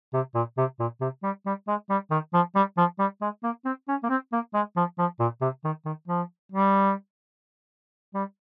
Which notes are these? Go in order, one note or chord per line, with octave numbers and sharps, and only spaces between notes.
C3
A#2
C3
A#2
C3
G3
G3
G#3
G3
D#3
F3
G3
F3
G3
G#3
A#3
C4
C#4
A#3
C4
A#3
G#3
F3
F3
A#2
C3
D#3
D#3
F3
G3
G3